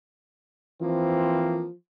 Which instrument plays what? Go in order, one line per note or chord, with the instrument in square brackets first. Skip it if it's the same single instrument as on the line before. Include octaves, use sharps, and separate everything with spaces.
[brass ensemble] E3 A#3 C4 [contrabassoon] F3